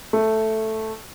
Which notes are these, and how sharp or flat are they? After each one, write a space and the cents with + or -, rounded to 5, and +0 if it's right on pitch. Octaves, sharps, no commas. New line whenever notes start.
A3 +0